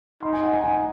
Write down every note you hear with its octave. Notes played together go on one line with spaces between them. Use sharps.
D#4 C6
G#5
F#5
G#5
G#5